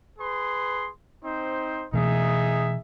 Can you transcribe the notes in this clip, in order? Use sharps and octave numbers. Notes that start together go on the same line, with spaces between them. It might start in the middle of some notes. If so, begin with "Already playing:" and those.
G#4 B4 C6
C4 D#4 C5
B2 E3 A3 D#4 G#4 E5